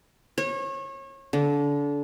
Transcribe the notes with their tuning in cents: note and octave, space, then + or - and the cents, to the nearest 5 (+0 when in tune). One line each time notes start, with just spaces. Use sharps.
C#5 -30
D3 -30